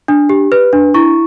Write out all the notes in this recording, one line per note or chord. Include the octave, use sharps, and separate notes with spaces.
D4
G4
B4
D4
E4 C#6